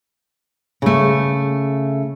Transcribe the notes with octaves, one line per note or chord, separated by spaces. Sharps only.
C#3 A3